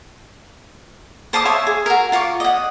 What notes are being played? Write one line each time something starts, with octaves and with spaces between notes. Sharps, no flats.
C5 A5 D6 D#6
C#5 E5 F5 C6
G#4
F#4 A#4
F4 F5 C#6 D6
D#5 F#5